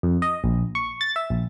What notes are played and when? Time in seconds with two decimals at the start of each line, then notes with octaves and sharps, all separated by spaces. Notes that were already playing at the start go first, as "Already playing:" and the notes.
0.03 F2
0.22 D#5
0.44 A#1
0.75 C#6
1.01 A6
1.16 E5
1.30 A#1